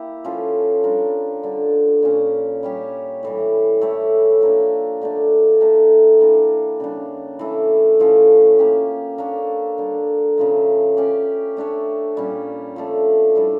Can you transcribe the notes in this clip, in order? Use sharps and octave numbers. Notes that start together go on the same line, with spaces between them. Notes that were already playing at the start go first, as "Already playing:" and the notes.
Already playing: A#3 E4 G4
F3 C#4 F4 A4
G3 D4 F4 A#4
D3 G3 D4
A#2 F3 C#4
G3 C#4 G4 C#5
A2 E3 G3
A3 E4 G4 C#5
F3 A#3 D4
D3 A3 D4
A3 D4 G4 A#4
E3 A#3 D4
C#3 G3 D4
E3 A3 E4
A2 F3 C#4
A#3 C#4 G4
A#3 D4 A4 C#5
D3 G3 D4
C#3 F3 A3
C#4 G4 D5 F5
A3 D4 A4 C#5
A#2 G3 C#4
F3 A3 D4
A2 G3 D4